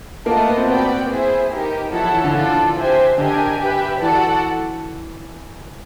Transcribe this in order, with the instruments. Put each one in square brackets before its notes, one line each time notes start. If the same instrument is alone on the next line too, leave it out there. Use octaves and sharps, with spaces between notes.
[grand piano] A#3 [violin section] F4 A#4 D#5 F#5 A5
[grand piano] A3
B3
C4
[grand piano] B3 [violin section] F#4 B4 D5 G5
[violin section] E4 G#4 C5
D#4 G4 A#4
[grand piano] F3 [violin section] E4 A4 C#5 F#5 A5
[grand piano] F3
E3
D3
[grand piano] D3 [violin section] F4 A4 D5
[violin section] G4 C5 E5 G#5
[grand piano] D3 [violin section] D4 G4 A#4 D#5 G#5
[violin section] G4 B4 E5
[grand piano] E3 [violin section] F#4 A4 D5 F#5 A5